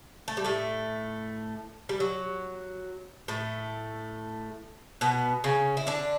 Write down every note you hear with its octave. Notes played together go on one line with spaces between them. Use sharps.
A3
G3
A2 A3
G3
F#3
A2 A3
B2 B3
C#3 C#4
E4
D3 D4